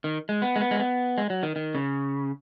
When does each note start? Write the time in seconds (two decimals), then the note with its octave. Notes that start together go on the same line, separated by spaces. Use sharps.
0.04 D#3
0.29 G#3
0.42 B3
0.56 G#3
0.61 B3
0.71 G#3
0.79 B3
1.18 G#3
1.30 F#3
1.43 D#3
1.56 D#3
1.75 C#3